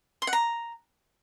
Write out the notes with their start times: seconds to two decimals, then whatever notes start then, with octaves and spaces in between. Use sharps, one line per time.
0.22 C6
0.27 F#5
0.33 A#5